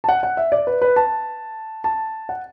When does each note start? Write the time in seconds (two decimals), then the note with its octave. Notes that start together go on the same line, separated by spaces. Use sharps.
0.04 A5
0.09 F#5
0.23 F#5
0.37 E5
0.52 D5
0.67 B4
0.82 B4
0.96 A5
1.84 A5
2.29 F#5